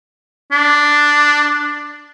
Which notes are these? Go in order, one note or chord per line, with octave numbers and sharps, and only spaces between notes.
D4